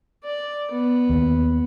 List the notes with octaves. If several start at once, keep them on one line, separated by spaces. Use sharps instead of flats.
D5
B3
D#2